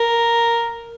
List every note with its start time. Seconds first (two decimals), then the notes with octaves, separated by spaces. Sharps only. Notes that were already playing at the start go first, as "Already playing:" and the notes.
Already playing: A#4